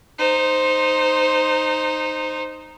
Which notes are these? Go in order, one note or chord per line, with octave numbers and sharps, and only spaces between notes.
D#4 C5